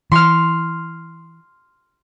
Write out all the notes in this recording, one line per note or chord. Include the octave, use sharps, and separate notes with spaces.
E3 C6 F6